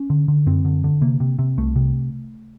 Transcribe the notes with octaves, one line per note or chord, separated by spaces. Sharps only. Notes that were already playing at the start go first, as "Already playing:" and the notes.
Already playing: C#4
D3
D3
F#2 C4
D3
D3
C3 A#3
C3
C3
C2 A3
C3